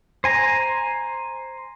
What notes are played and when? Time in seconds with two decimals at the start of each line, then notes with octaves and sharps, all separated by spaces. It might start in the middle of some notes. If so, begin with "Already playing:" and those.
0.24 C5 G#5 A#5